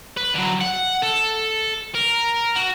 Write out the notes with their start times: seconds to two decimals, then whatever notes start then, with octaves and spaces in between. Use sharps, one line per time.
0.17 B4
0.35 D3 F#3
0.61 F#5
1.02 A4
1.95 A#4
2.56 F#4